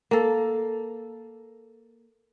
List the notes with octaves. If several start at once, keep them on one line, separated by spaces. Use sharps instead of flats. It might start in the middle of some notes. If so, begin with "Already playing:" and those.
A#3 A4